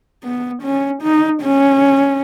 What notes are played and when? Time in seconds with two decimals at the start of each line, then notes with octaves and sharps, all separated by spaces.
0.24 B3
0.63 C#4
1.02 D#4
1.42 C#4